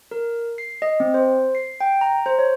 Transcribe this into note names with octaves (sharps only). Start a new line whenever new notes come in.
A#4
C7
D#5
C4
C5
C7
G5
A#5
C5
C#5